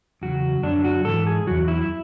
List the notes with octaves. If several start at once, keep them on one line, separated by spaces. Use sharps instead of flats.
E2 C#3 F#3 F#4
F#2 D3 F#3 D4
F#4
G#2 E3 A4
G#4
E2 B2 F#3 F#4
E4